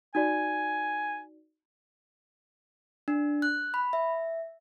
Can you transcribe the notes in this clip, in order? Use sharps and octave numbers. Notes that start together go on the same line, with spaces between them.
D#4 F#4 D5 G#5
D4
F#6
B5
E5